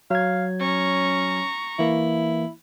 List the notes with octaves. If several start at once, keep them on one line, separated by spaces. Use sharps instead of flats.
F#3 F5 G#6
C#4 A#5 C#6
E3 A#3 E4